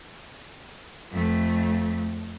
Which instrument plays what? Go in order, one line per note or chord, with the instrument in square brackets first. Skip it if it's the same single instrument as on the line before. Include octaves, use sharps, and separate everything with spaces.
[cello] F2 A3